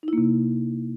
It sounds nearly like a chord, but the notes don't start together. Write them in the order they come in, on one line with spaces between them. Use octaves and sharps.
D#4 E4 A#3 C3